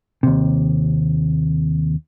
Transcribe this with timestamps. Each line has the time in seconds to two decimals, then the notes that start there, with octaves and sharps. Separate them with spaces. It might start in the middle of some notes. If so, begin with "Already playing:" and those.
0.23 D#2 C3